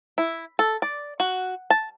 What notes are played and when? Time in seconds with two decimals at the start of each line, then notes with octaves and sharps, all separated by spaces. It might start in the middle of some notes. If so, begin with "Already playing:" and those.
0.18 E4
0.59 A4
0.82 D5
1.20 F#4
1.70 A5